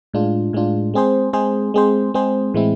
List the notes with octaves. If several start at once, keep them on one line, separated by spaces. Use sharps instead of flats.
A2 G#3 D4 F4
A2 G#3 D4 F4
G#3 C4 G#4 C5
G#3 C4 G#4 C5
G#3 C4 G#4 C5
G#3 C4 G#4 C5
A2 E3 G#3 C4 E4